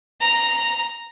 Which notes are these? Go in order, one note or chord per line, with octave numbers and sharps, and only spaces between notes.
A#5